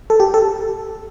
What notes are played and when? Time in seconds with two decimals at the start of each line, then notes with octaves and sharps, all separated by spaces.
0.10 A4
0.20 G4
0.34 A4